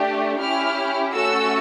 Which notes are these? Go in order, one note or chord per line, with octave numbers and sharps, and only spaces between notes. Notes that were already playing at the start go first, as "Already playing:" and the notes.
Already playing: A3 D4 G4
C#4 E4 G4 F6
A3 C#4 F#4 A4 E6